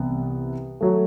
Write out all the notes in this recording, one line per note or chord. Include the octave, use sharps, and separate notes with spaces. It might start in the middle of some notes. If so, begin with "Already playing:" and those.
Already playing: C2 C3 E3 B3
F#3 A3